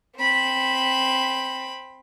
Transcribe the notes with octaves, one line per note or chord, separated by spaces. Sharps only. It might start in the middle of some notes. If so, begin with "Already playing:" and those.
C4 B5